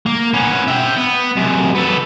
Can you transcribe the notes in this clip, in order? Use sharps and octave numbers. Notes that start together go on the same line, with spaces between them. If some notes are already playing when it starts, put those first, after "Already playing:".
A#3
B3 C#4
E5 G5
B3
F#2 C3
B3 A4